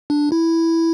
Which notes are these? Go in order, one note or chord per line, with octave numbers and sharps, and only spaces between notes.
D4
E4